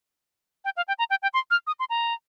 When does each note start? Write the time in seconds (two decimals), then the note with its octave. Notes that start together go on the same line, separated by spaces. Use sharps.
0.65 G5
0.77 F5
0.88 G5
0.99 A#5
1.10 G5
1.22 G5
1.34 C6
1.51 F6
1.67 D#6
1.80 C6
1.90 A#5